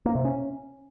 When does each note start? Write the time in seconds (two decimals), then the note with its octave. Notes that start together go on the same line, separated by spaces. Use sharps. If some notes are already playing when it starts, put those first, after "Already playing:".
0.06 A#3
0.15 C3
0.25 C#4